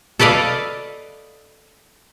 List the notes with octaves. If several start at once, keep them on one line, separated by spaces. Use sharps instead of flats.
A4 B4 D5 D#5 F5